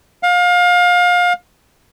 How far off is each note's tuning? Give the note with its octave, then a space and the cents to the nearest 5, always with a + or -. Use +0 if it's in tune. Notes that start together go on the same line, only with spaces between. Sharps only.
F5 +30